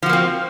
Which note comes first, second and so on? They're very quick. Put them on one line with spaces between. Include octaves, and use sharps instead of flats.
F3 F#4 A#3 C4